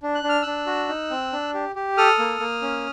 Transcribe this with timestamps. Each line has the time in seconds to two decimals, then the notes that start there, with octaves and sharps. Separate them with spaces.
0.03 D4
0.15 F#6
0.23 D4
0.29 F6
0.42 D4 E6 F#6
0.67 F#4
0.89 D#4
1.11 C4
1.32 D4
1.54 G4
1.76 G4
1.97 A4 D#6 F6
2.19 A#3
2.40 A#3
2.62 C#4